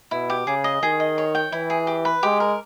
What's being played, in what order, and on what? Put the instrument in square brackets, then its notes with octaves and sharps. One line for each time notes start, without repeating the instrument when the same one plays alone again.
[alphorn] B2 [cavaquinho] E4
[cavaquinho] G4
[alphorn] C#3 [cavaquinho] G#4
[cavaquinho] D#5
[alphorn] D#3 [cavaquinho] G#4
[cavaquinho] D#5
C#5
G5
[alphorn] E3 [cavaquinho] E4
[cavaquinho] G#4
G4
B4
[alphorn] G#3 [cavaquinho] G4
[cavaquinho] A#4